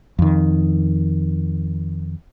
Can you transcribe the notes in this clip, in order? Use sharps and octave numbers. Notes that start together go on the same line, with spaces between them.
F2 D#3